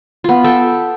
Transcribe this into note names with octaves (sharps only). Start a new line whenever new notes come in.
B3 F4
A4 E5 G5